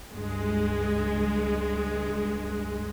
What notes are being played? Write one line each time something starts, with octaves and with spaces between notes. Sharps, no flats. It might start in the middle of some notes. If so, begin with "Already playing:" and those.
C#2 G2 G#3